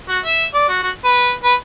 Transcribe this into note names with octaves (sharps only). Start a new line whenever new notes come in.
F#4
E5
D5
F#4
F#4
B4
B4